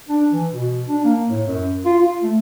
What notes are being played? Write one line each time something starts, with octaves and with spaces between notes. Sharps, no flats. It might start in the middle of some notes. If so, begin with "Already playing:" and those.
D4
E3
B2
D4
A#3
A2
F#2
F4
F4
A3